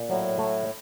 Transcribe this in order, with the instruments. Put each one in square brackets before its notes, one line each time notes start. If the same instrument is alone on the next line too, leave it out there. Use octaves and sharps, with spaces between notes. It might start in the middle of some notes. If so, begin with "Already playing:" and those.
Already playing: [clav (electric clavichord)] A#2
[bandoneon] A2 [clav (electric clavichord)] F#3
[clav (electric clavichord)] A3